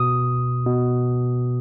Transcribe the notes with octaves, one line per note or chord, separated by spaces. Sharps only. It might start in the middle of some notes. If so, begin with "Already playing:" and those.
Already playing: B2 D#6
B2